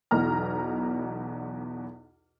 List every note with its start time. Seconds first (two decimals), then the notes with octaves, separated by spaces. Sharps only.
0.11 B1 E2 B2 A#5 F6